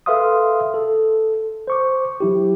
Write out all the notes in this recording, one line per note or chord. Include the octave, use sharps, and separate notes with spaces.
A4 B4 E5 F5 C6 D#6
A4
C5 C#6 D6
F#3 E4 G4